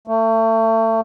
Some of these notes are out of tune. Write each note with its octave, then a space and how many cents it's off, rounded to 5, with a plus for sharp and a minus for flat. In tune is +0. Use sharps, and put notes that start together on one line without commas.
A3 +30